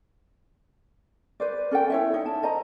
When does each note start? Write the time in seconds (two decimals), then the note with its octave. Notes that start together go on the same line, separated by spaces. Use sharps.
1.40 B4 C5 D5
1.71 C#4 A4 A#4 G5
1.90 E4 C#5 E5
2.14 D#4
2.26 A5
2.43 C5 D#5 A#5